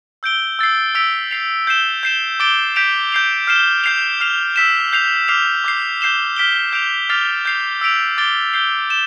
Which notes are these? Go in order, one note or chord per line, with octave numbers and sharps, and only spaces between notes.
E6 G6 D7 G7
E6 A6 C7
E6 B6 D7 F7
A6 C7 F7
G6 C7 E7 G7
G6 C7 E7 G7
D6 A6 D7 G7
G6 B6 D7 F7
G6 C7 F7
F6 C7 E7 G7
G6 C7 F7
F6 C7 F7
E6 B6 E7
G6 C7 F7
D6 F6 C7 F7
D6 G6 C7
G6 C7 E7 G7
F6 B6 D7 G7
G6 D7 F7
D6 F6 A6 C7 F7
G6 C7 F7
E6 B6 D7 F7
D6 A6 D7 G7
G6 C7 G7
E7 G7